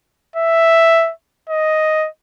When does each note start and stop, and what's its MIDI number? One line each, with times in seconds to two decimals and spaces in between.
0.36 1.11 76
1.49 2.08 75